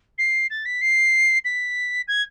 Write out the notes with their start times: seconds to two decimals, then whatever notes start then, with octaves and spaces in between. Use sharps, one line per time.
0.18 C7
0.50 A6
0.65 B6
0.81 C7
1.45 B6
2.08 G#6